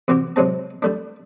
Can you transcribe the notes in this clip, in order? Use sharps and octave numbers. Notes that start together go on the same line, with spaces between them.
C3 E3 C4 F#4 G4
C3 F#3 G#3 C4 A5
G3 A3 D4